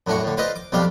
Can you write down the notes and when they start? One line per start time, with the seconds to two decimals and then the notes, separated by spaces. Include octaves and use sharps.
0.07 F#2 A2 D4 F#4 C#6
0.24 A2 D3
0.37 F4 B4 C5 D5 D#5 F5
0.56 D6
0.72 B1 F2 G3 D4 G4 F5